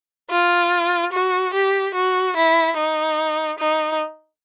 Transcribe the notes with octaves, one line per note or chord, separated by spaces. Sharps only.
F4
F#4
G4
F#4
E4
D#4
D#4